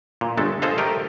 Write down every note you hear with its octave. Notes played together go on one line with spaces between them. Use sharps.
A#2
G1 G#3 A3 A4
G#4 A4 C5 D#5 F5
A3 G4 A#4 D#5